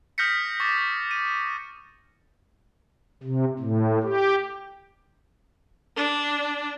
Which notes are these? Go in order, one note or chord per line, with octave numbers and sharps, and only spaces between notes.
D#6 F6 G6 A#6 B6 C#7
C#6 D6 A6
D#6
D#7
C3
A2
G4
D4